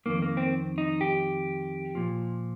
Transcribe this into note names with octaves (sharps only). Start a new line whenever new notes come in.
F2 D#3 A#3
A#3
C4
D#4
G4
A#2 F3